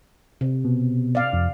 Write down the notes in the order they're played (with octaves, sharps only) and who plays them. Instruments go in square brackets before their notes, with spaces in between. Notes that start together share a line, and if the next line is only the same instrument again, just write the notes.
[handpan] C3
[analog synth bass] B2
[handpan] D5 F5
[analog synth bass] F2